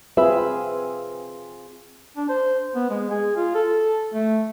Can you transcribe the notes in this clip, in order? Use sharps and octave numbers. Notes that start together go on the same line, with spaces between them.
C4 F4 G#4 B4 E5
D4
C5
B3
G#3
G#4
F4
A4
A3